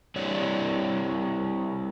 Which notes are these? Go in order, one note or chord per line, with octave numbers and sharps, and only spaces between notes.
G3 C4 E4 G4 C#5 D5